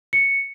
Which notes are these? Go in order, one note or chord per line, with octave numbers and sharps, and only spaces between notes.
C#7